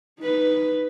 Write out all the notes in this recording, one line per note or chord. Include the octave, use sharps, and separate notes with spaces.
D#4 B4